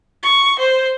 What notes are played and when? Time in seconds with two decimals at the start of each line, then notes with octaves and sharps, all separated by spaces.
0.23 C#6
0.59 C5